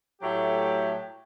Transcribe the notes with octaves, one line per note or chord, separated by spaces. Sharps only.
A2 F#3 A3 G4